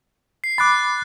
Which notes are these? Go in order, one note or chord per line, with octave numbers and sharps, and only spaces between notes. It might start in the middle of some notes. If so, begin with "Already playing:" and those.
C7
B5 D6 F#6 A6